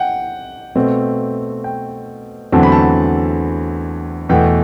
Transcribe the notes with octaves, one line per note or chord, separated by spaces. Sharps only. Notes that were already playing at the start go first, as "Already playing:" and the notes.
Already playing: F#5 G5
B2 A3 C4
G5
E2 D3 F#3 A3 C4 A5
B5
A5
E2 B2 A3 G5